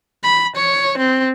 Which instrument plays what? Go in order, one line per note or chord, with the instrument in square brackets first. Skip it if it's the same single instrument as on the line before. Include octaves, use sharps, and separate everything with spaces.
[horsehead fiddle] B5
C#5
C4